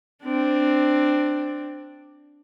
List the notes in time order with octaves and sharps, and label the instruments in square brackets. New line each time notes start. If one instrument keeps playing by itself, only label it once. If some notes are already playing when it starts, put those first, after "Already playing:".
[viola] C4 D4